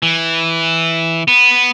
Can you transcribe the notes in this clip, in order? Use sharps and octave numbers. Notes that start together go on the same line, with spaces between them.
E3
B3